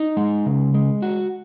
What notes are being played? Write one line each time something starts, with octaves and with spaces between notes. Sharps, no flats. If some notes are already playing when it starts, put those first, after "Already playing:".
Already playing: D#4
G#3
C#3
G#3
F#4